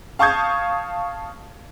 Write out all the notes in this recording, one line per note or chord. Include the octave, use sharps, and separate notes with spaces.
F5 A5 C#6 D#6 G6 G#6